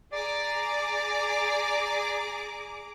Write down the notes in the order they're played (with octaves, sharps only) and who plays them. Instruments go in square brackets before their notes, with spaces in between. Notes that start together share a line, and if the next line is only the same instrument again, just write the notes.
[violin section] G#4 A#5 D6 [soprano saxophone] D5